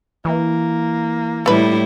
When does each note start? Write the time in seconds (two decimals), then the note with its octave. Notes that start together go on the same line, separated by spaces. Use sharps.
0.25 E3 A#3
1.46 A2 G3 A3 E4 B4